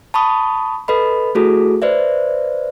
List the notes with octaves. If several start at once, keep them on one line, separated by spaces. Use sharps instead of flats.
A5 B5 C#6 D#6
A4 B4 D#5 B5
A3 E4 F#4 G#4 A4
B4 C5 D5 E5